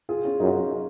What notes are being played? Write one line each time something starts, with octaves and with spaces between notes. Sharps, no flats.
F4 G#4
C#4 F4
F#2 D#4